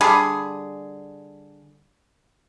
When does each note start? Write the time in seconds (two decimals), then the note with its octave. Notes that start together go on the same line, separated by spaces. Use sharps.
0.01 D3 G3 G#4